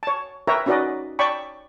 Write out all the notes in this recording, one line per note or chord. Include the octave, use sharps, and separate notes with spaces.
C#5 A5
A#4 B4 C#5 E5 G5 A#5
C#4 D#4 F#4 B4 D5 D#5
C#5 D5 G5 A5 B5 C#6